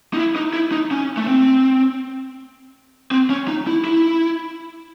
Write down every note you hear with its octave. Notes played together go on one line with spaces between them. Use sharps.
D#4
E4
D#4
E4
D#4
C#4
A3
C4
C4
C#4
D#4
E4
E4